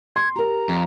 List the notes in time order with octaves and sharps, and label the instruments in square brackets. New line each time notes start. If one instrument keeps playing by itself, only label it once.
[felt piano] C6 [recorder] G#6
[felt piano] G4 A#4 [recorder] A#5
[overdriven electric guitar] F2